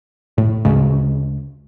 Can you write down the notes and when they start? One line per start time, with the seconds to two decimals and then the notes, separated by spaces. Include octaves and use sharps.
0.38 A2
0.65 D2 C#3 G#3